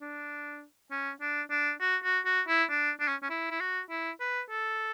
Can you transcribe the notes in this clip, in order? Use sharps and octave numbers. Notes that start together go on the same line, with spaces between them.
D4
C#4
D4
D4
F#4
F#4
F#4
E4
D4
D4
C#4
C#4
E4
E4
F#4
E4
B4
A4